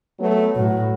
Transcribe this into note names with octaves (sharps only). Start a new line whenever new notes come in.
F#3 A3 B3
A2 F#3 F#4